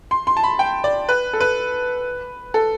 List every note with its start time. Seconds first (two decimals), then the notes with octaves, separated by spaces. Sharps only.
0.11 C6
0.27 C6
0.37 A5
0.43 B5
0.59 G5
0.84 D5
1.09 B4
1.33 A4
1.40 B4
2.54 A4